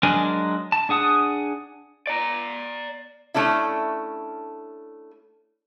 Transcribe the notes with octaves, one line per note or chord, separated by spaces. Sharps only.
F#3 G#3 D4 A#4 G#5
A5
D4 G#4 F#5 D#6
D5 A#5
A3 C#4 D4 E4